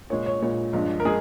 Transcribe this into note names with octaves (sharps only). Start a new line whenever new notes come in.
A#2 G#3 C#5
C#5
A#2 G#3 C#5
G2 F3 G#3
A#4
G#3 G#4